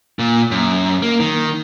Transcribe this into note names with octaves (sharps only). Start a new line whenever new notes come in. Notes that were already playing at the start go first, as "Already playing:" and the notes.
A#2
F#2
A#3
D#3